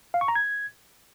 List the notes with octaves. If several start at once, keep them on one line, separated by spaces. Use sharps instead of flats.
F5
C#6
A#5
G#6